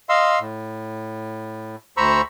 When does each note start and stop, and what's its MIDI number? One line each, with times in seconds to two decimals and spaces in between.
0.09 0.39 75
0.09 0.39 77
0.09 0.39 84
0.09 0.39 88
0.40 1.76 45
1.97 2.21 38
1.97 2.21 72
1.97 2.21 82
1.97 2.21 83
1.97 2.21 85
1.97 2.21 88